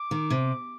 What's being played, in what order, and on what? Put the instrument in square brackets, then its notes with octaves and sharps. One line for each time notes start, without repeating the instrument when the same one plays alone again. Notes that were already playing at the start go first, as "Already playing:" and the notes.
Already playing: [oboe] D6
[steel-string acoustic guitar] D#3
C3